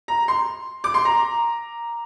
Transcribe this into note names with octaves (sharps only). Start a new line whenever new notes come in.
A#5
C6
D6
C6
A#5